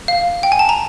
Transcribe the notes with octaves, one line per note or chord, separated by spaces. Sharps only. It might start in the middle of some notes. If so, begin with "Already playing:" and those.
F5
G5
G#5
A5
A#5